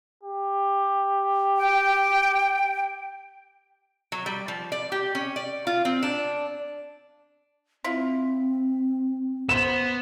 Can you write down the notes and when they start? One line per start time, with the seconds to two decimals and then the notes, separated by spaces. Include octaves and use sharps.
0.24 G4
1.57 G5
4.12 F#3
4.26 G3
4.48 F3
4.72 D5
4.92 G4
5.15 C#4
5.36 D5
5.67 F4
5.85 C4
6.03 D4
7.84 C4 E4 F4
9.49 B3 B4 C5 E7